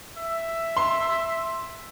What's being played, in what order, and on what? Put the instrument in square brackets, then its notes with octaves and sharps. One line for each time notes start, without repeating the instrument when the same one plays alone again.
[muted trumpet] E5
[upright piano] C6